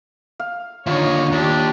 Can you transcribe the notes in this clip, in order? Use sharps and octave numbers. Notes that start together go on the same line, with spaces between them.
F5
D#2 D3 D#4 F4 C#5 C#6
D#2 D4 G4